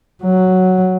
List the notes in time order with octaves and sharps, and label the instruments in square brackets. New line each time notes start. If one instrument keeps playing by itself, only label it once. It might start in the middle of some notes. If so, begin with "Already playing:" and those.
[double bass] F#3